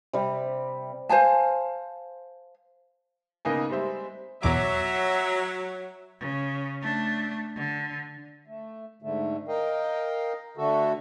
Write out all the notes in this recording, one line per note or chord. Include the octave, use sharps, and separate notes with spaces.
C3 G3
C5 F5 G#5 A5
C#3 A#3 B3 D#4 B4 G#5
G3 G#3 C4 C5 E5
E2 B2 F#3 E5 A#5 D6
C#3
A3 D4
D3
A3
G#2 D3 A3
A#4 D#5 F5 G5
D3 A3 F#4 A4